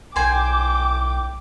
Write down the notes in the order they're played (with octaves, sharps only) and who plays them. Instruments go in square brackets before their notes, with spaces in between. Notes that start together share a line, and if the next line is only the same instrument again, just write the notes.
[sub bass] B1 [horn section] A2 G5 [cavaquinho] C5 G#5 [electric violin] D6